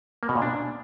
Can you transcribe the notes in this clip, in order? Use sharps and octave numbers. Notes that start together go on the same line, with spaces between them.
A#3
B2
A#2
D4